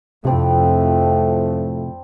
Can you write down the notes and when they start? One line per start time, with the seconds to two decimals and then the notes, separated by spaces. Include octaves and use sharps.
0.25 F2 A2 C3 F3 G3 A3 C4 D4